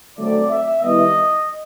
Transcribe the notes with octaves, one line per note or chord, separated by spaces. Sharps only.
D3 F#3 A3 C4 D5
E5
D#3 G3 B3 E4 D#5